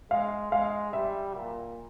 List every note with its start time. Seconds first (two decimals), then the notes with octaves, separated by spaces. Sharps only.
0.11 G#3 F5
0.51 G#3 F5
0.93 G3 E5
1.35 A#2